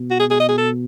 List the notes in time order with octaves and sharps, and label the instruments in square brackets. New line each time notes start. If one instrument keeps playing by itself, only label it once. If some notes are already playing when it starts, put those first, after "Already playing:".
Already playing: [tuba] B2
[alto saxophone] F#4
G#4
G#4
D#5
G#4
A4